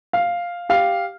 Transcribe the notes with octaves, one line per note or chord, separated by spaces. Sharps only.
F5
G4 F5